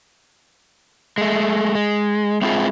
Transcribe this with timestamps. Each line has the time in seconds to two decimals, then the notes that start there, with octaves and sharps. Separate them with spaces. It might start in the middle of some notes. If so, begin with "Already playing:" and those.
1.18 G#3 A3
1.75 G#3
2.42 G#3 C4 E4 F4 G#4